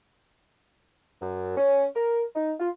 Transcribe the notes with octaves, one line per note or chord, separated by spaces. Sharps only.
F#2
C#4
A#4
D#4
F4